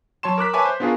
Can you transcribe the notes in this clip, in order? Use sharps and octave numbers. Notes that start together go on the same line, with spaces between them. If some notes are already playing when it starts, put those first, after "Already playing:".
F#3 C#5 A5 C6 E7
A#4 D6 F#6 B6
B4 C#5 E5 G#5 A5 D6
C5
B3 D4 F4 F#4 G#4 A#4